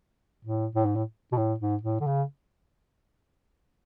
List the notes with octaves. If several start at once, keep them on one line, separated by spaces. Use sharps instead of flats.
A2
A2
G#2
A2
B2
A2
G#2
A2
D3
C#3